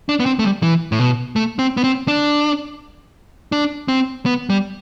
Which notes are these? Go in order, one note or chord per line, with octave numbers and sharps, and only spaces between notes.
D4
B3
C4
A3
G3
E3
A2
B2
A3
C4
B3
C4
D4
D4
C4
B3
G3